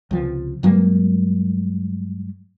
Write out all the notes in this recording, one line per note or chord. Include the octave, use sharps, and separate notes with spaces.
C#2 C3 F3
G2 F#3 G#3 A#3